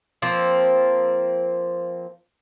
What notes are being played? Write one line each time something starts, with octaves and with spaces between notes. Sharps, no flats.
F3 A#3 C4